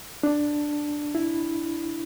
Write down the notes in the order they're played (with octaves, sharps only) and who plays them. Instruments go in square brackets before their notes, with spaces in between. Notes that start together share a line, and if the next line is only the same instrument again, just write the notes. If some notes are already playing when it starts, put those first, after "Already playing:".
[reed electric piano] D4
E4